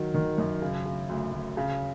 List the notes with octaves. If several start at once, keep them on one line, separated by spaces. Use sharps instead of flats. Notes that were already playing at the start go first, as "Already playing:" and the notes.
Already playing: D#3 F#3
D#3
F#2
C#3
C#3
D2
D2
C#3